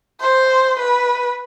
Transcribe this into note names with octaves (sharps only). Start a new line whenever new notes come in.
C5
B4